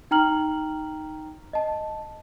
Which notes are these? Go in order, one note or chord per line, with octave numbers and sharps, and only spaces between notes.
D#4 G5 A#5 F6 F#7
D#5 A5